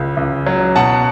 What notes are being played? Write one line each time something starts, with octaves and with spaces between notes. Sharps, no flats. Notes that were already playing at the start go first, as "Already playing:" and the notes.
Already playing: C#2 C#3
C#2
F#3
B2 F#5 A5